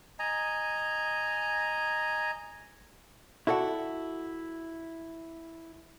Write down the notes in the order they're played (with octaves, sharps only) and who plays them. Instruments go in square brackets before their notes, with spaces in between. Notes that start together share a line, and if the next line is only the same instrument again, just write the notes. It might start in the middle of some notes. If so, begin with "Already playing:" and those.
[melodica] D#5 G#5 A#5
[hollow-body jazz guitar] E4 F#4 A4 D5 F#5